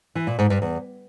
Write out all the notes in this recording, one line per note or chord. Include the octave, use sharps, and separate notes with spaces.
E3
A#2
G#2
G2
E2